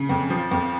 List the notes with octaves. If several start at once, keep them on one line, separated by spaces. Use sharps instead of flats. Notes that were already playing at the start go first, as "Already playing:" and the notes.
Already playing: C#3
F2
F3
F2